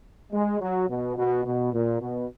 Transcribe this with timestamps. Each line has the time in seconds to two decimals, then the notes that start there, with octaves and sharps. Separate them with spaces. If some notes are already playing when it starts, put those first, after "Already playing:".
0.32 G#3
0.60 F#3
0.88 B2
1.16 B2
1.45 B2
1.73 A#2
2.01 B2